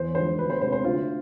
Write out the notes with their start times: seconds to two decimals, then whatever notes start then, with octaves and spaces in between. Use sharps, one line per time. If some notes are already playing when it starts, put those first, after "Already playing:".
Already playing: E2 C5
0.15 D3 F3 G#3 C5
0.38 D2 B4
0.50 C5
0.61 C3 G#3 C5
0.72 C5
0.84 D2 F4